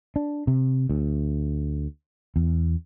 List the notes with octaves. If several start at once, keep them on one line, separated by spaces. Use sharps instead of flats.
D4
C3
D2
E2